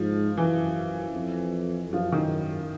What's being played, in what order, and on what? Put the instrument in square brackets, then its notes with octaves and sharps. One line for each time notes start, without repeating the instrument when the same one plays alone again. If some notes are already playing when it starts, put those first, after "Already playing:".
Already playing: [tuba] G#2 [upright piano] F3
[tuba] F#2 [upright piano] E3
[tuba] F2
[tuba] F#2 [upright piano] F3
[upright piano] D#3